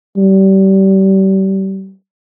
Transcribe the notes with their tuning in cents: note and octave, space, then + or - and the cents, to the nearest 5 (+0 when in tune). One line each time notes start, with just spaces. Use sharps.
G3 -30